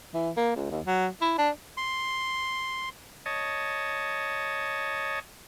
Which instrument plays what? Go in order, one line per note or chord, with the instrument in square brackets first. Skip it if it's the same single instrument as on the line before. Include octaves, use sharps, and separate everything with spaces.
[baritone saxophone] E3
A#3
C#2
D#2
F#3
E4
D4
[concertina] C6
[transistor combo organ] C#5 D#5 A5